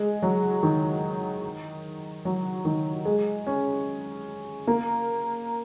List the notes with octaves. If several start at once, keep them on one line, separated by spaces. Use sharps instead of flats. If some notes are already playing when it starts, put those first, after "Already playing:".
Already playing: G#3
F#3
D#3
F#3
D#3
G#3
C#4
A#3